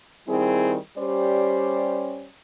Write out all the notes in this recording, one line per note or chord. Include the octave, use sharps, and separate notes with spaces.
D#3 G3 C4 E4 G#4
G3 C#4 G4 C5 D5